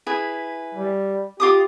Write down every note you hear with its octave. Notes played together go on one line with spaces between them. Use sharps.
E4 G#4 B4
G3
F4 G4 D6 D#6